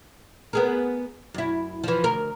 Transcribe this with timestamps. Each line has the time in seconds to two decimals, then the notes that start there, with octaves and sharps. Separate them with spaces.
0.53 B3 G#4 A#4
1.34 F#2 E4
1.84 E3 F3
2.04 D2 A#4